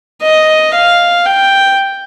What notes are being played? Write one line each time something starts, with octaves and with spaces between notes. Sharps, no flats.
D#5
F5
G5